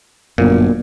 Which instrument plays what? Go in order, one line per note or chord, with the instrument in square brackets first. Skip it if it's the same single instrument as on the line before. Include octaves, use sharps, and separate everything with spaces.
[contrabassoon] G1 [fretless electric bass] F#2 [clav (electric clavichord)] A#2